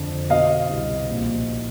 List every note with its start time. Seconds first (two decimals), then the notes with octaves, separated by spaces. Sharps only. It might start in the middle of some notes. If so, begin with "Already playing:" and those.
Already playing: F2 D3
0.30 B2 D#5 F5
0.70 C2
1.10 A#1